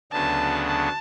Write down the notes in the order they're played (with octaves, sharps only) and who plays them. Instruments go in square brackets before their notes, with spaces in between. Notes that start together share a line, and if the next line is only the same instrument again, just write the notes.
[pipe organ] D2 C#3 F#3 B3 D4 [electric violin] A5
[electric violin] A5